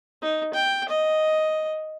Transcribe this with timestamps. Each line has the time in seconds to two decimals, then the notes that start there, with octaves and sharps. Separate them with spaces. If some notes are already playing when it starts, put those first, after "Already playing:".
0.22 D#4
0.54 G5
0.89 D#5